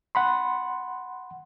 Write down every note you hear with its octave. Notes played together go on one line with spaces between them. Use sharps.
F#5 B5 C6